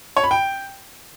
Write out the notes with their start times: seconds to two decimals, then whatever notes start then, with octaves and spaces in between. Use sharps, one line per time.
0.17 C#5
0.24 B5
0.31 G5